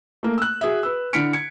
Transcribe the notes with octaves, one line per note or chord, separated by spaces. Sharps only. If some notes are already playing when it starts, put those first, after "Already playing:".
A3 A#3
E6 F#6
F#4 G#4 E5
B4 E6
D3 E4 F6 B6 C#7 D7
G#6 C#7